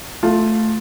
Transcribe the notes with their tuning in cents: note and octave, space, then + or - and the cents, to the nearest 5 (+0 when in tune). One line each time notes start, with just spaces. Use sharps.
A3 +0 F4 +10